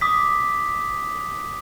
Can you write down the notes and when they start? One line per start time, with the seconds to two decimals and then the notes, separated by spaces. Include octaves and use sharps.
0.01 D6 D#6 B6